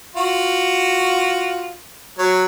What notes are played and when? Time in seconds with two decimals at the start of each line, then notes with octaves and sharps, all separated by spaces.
0.15 F4 F#4
2.19 F#3 C#5